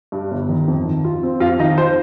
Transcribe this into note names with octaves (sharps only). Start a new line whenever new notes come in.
G2
G1
D#3
F2
D#3
F4
C4
F2 F4 F5
D#3 D#4 D#5
F4 C5